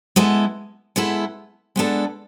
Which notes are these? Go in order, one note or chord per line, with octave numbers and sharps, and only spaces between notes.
G#3 B3 E4 A4
G#3 B3 E4 A4
G#3 B3 D4 A4